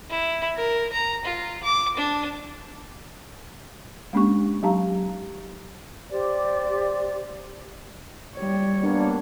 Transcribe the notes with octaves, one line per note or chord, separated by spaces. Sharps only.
E4
A#4
A#5
F4
D6
D4
G#3 A#3 C#4 D4 G4 C#6
F#3 D#4 G4 F5 A5 A#5
G4 C5 D5
G3 C#5
A#3 B3 D4